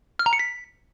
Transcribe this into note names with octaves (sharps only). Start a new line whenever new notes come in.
F6
A#5
C#7
B6